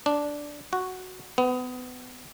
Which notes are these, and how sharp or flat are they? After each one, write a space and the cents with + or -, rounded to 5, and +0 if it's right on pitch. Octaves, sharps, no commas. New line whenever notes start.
D4 -5
F#4 +0
B3 +25